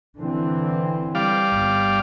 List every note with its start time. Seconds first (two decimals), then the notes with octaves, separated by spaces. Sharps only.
0.20 D3 E3 C4
1.15 G3 D5 F5
1.52 G1